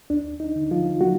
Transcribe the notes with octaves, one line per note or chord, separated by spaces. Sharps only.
D#2 D4
D#4
D3
F3 F4
F#3 A#3 F#4